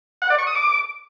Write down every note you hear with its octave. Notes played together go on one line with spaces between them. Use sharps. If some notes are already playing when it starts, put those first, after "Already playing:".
F#5
D5
C#6
D#6
D6